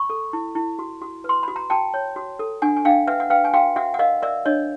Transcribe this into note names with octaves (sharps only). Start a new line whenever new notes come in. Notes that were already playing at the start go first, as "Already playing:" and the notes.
Already playing: B5 C#6
A4
E4
E4
F#4
F#4
B4 C6
F#4 B5
A#5
F#4 G5 A5
C#5
F#4
A4
D4 F#5 G#5
G#5
D4 F5 G5
B4 E5 F#5
F#5
B4 F5 G5
G#5
F#4 F5 G5
F#4 E5 F#5
F#5
A#4 D#5 F5
A#4 D5 E5
D4 C#5 D#5